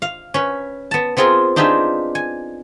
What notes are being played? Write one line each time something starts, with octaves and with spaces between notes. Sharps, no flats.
F5
C#4 B4
B3 A5
B3 C4 F4 G#4 A#4
D4 D#4 F4 G4 G#4 E5
G#5